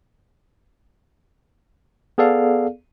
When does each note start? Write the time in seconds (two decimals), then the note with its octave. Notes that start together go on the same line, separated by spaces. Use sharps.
2.18 B3 G#4 A4 D5 F5